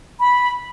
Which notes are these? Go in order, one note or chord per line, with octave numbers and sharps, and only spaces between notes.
B5